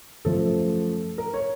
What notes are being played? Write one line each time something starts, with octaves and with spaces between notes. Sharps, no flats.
F#2 F3 A3 A4
A#4
C#5